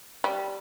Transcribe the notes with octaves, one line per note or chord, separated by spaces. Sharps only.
G3